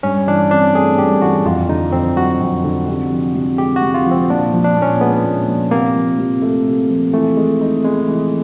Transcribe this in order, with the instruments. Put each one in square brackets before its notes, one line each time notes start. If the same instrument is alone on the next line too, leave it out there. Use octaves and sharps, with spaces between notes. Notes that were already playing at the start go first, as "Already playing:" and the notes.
[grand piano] G2 [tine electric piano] C#4
[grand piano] E3 [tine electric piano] D4
[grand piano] C4 [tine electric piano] D4
[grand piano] A3 [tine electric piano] G#4
[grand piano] G2 [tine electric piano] G4
[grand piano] E3 [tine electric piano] F#4
[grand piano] F2 [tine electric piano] F4
[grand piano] D3 [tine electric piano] D#4
[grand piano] F2 [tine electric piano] C4
[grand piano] F#3 [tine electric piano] F#4
[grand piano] F2
D3
C3
F3
C3
[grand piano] G#3 [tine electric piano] G4
[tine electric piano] F#4
[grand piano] C3
[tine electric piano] F4
[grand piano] F3
[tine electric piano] C4
[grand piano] A#2 [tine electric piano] D4
[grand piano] F3
[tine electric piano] D4
[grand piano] A#2
[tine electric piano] C#4
[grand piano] G#3 [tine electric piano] B3
[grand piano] A#2
F3
[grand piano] C3 [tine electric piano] A#3
[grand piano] F3
C3
A3
C3
F3
[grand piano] E3 [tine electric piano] A3
[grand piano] G#3
D#4
[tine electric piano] G#3 [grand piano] B3
[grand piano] E3